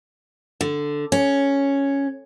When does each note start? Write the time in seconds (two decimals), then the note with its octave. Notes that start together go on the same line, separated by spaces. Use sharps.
0.61 D3
1.12 C#4